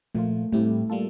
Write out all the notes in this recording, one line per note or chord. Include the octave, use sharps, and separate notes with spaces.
A#2 F3 A3 A#3 F4
A2 G3 A3 C4 E4 G4
G3 A#3 F4 A4